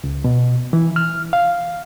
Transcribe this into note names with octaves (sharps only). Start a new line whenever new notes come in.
C#2
B2
E3
F6
F5